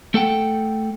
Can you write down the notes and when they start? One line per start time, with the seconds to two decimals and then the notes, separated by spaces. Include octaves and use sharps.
0.14 A3 A4 F#5 G5